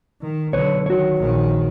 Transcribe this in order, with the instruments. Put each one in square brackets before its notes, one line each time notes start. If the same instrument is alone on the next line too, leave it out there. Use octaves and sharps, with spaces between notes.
[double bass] D#3
[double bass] B1 D3 [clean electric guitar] B4 C#5
[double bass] D#3 [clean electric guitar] F#4 C#5
[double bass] A#1 D#3